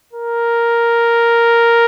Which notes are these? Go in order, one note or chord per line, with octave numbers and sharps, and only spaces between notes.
A#4